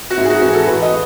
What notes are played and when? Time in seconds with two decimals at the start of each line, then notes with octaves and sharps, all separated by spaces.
0.10 F#4
0.17 G#2 E4
0.25 G#4
0.30 F#4
0.41 E3 F#4
0.54 A4
0.66 A1 B4
0.82 D#5
0.90 A3